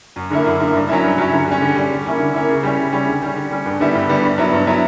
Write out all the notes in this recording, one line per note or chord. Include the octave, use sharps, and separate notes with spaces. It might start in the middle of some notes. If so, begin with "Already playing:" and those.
F#2
D3 A#3 E4
F#2
D3 A#3 E4
G2
F#3 C#4 E4
G2
F#3 C#4 E4
D3
G3 C#4
D3
G3 C#4
D3
A#3 C#4 E4
D3
A#3 C#4 E4
C#3
G3 C#4 E4
C#3
G3 C#4 E4
D3
G3 C#4
D3
G3 C#4
G2
D3 G3 B3 E4
G2
D3 G3 B3 E4
G2
F#3 B3 E4
G2
F#3 B3 E4